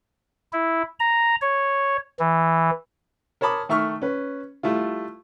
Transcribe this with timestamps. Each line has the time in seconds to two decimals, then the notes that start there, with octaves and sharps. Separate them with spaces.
0.53 E4
1.00 A#5
1.42 C#5
2.19 E3
3.41 A#4 C#5 A5 B5 D6 D#6
3.69 D#3 A3 E5 C#6 F6
4.02 C#4 B4
4.63 G3 A3 E4 F4